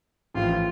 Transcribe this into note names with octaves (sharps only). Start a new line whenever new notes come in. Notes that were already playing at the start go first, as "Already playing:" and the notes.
A1 A2 F3 A3 F4